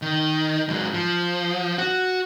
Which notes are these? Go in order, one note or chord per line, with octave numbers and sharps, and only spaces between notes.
D#3
G#2 F#3
F3
F#4